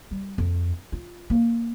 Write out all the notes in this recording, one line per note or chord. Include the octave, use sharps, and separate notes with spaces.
G3
F2
F4
A#3